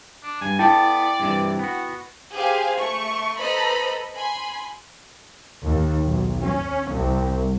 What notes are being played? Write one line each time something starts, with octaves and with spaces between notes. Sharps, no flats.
D4
G2 G#5
B3 E4 A4 D5 G5 A5
G2 C3 E3
B3 F#4
G4 G#4 C5 F5 G#5
A3 C#6
A4 B4 C5 D#5 A#5 B5
G#5 B5 C6
D#2
B1
C#4
C2